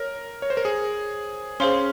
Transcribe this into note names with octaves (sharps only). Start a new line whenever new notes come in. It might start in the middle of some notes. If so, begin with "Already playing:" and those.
Already playing: A#4 C#5
C#5
C5
A#4
G#4
C#4 G#4 C5 F5 C6